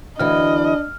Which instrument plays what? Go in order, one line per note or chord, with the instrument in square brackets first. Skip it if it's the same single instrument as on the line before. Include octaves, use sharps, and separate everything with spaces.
[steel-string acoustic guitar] D2 E3 [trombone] D4 [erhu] D#5 [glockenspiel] F6